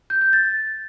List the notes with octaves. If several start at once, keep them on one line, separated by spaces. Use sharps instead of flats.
G6
G6
A6